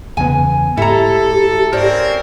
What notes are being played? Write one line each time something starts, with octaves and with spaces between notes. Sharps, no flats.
E2 C#3 B3 G#5
G#2 E4 G4 A4 A#5
C4 C#4 A#4 C5 D5